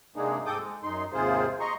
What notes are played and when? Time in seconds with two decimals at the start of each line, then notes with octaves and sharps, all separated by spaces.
0.16 C3 G#3 A#3 D4 D#4 G#4
0.46 G#2 C4 A4 D6 D#6 G6
0.59 G#3
0.83 F#2 D#4 C6
1.13 D#2 G#2 C3 F4 G#4 C5
1.60 D#5 A#5 C6 C#6